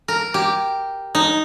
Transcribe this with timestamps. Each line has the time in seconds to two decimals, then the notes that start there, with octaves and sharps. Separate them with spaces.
0.08 A#4
0.34 G4
1.15 D#4